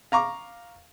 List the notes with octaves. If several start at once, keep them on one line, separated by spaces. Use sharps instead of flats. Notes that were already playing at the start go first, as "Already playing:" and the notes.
F5 A#5 C#6 D6